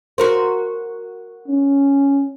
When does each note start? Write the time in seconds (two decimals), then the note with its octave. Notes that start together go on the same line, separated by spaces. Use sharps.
0.18 F#4 A#4 C5
1.48 C#4